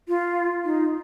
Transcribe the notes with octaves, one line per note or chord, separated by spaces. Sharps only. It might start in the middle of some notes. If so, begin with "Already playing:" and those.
F4
D#4